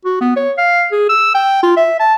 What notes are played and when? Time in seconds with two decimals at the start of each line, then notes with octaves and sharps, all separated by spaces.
0.05 F#4
0.21 B3
0.36 C#5
0.58 F5
0.92 G#4
1.09 E6
1.35 G5
1.63 F4
1.77 E5
2.00 A5